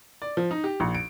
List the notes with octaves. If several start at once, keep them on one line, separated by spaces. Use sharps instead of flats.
D5
F3
D#4
G4
A#1
D7